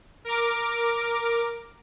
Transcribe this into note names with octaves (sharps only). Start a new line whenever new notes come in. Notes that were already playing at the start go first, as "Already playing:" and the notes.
A#4 D6